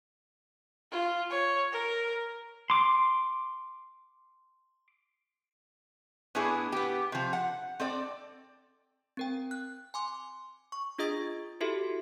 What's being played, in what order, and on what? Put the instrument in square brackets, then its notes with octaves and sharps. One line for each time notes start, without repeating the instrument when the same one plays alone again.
[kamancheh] F4
C#5
A#4
[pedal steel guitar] C6 D6
[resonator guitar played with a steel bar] A2 B3 D4 E4 G#4
B3 G4
C3 F3
F#5
C4 A4 D5
[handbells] C4 A#4 G5
F#6
G#5 C6 D6
C#6
D4 F4 G#4 D#5 D#6 A6
E4 F#4 G4 A4 E5